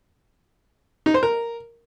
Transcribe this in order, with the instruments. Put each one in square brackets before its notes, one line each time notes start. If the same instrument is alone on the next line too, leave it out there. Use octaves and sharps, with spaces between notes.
[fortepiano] D#4
C5
A#4